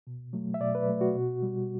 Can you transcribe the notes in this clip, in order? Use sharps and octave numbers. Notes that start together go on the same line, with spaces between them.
B2
F#3 A3
E5
B2 D5
B4
F#3 A3
F#4
B2
G3